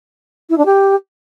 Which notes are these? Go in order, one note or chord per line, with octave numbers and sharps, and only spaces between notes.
E4
D4
G4